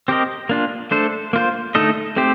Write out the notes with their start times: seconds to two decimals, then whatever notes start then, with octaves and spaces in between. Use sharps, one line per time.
0.08 C4 G4 A#4 D#5
0.49 A#3 D4 F4
0.91 A3 D4 A4 C5
1.33 A#3 F4 C5
1.75 D3 A3 D#4 A4 D#5
2.16 A3 C4 G4 C5